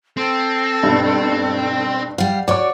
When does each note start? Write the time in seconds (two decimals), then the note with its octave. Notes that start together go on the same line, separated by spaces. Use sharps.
0.17 C4 A4
0.83 B1 G2
2.18 G3 F5 F#5
2.48 F#4 C#5 D5 D6